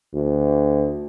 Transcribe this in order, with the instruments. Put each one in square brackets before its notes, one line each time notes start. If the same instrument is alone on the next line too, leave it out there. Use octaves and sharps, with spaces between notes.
[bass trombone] D2